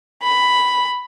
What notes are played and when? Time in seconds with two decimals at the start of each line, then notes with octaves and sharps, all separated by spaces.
0.23 B5